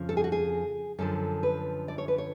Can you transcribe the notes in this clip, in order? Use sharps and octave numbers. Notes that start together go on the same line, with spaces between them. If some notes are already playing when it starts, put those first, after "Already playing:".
Already playing: F2 C#3 F3
A4
G#4
F#4
G#4
F#2 D3 F3 A4
B4
D5
C#5
B4
C#5